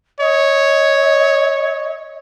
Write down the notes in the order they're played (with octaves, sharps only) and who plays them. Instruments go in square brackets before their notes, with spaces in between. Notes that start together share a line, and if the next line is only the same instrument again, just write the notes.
[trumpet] C#5 [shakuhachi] D#5